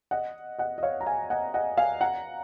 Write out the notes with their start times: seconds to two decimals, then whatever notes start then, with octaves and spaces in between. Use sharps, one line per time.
0.11 D#5 F#5
0.59 D#5 F#5
0.78 D#5
0.83 C#5 F5
1.01 A#5
1.06 F5 G#5
1.30 D#5 F#5
1.54 D#5 F#5
1.77 F5 G#5
2.01 F#5 A#5